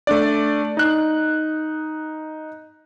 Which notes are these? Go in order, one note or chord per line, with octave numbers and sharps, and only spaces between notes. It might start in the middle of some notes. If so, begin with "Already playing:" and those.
A3 D4 D5
D#4 F#6